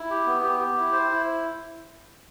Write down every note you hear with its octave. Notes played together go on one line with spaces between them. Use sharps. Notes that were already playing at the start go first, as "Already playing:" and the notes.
Already playing: E4
G4
B3
G4
G4
E4
C5
E4